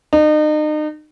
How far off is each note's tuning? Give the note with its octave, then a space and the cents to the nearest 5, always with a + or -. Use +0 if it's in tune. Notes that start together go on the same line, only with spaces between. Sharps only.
D#4 -35